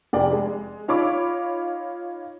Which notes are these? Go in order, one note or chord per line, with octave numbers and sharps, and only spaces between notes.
F1 G#4 D5 G5
G#3
D#4 F4 C#5 F5 B5 D6